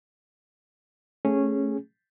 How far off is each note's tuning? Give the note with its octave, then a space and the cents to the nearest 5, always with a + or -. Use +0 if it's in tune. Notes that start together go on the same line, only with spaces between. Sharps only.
A3 +0 C#4 -10 G#4 -5